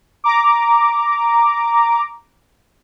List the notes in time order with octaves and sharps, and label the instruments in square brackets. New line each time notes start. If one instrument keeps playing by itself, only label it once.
[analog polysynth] A#5 D6